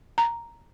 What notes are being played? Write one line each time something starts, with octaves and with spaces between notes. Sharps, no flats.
A#5